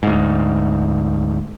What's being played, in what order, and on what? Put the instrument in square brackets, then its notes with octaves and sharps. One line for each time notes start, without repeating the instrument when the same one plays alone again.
[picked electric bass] D2 G#2